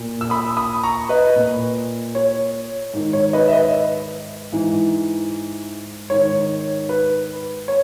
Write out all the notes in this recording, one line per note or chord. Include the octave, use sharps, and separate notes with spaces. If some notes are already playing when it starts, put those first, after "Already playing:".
Already playing: A#2
E6
B5 D#6
B5 D#6
A#5 C#6
B4 D#5
A#2
C#5
G#2 D#3
C#5
B4 D#5
E5
B4 D#5
G#2 E3
G#2 D#3 C#5
B4
C#5